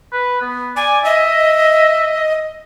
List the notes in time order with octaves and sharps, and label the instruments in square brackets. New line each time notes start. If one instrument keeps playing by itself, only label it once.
[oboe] B4
B3
[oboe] D5 [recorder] G#5
[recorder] D#5 [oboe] E5